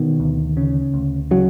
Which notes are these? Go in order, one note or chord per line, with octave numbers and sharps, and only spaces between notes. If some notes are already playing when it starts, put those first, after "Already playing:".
Already playing: B2 D#3
D2
C#3
D2
C#3 F#3